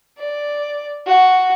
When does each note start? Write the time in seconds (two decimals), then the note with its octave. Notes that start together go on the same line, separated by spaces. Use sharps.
0.18 D5
1.07 F#4